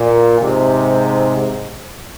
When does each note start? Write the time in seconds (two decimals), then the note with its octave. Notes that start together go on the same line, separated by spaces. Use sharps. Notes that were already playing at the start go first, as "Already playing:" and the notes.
Already playing: A#2
0.40 G#2 C3